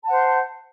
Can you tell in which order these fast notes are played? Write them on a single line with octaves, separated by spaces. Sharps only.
A5 F#5 C5